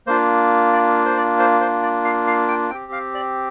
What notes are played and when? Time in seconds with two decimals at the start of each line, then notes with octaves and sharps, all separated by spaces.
0.07 A#3 D4 F4 C5
0.73 D5
1.06 C5
1.17 D5
1.39 C5
1.61 C5
1.82 D5
2.05 F5
2.27 F5
2.48 G5
2.70 C4 G4 G5
2.92 F5
3.15 D5